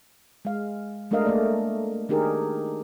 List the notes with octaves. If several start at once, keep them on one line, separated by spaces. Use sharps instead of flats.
G#3 F5
G#3 A3 D4 A#4 D#5 F5
A3 A#3 D5
D#3 D4 D#4 G4 G#4 A#4